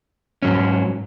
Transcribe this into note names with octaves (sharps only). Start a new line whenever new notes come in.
G#2 F#3 C#4